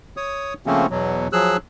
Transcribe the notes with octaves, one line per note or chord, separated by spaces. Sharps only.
C#5 D#6
C#3 F3 A3 A#3 C4 C#4
E2 B2 F#3
F3 F#3 G#4 E6 F#6